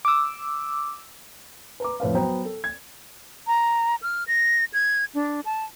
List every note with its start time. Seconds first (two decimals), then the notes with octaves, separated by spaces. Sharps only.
0.05 D6 E6
1.80 B4 A#5 D6
2.00 F2 A2 B4 F5
2.15 F#3 B3 C5 G5 A#5
2.45 A4
2.64 G#6
3.47 A#5
4.02 F6
4.27 A#6
4.74 G#6
5.15 D4
5.45 A5